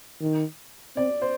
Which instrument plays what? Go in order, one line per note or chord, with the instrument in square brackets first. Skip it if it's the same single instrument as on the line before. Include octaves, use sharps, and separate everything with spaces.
[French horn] D#3
[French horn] C4 [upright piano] D5
[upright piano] C5